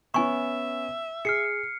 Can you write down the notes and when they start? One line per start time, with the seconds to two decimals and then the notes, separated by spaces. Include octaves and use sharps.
0.14 B3 C#4 E5 G#5 C#6
1.25 G#4 F6 C7 C#7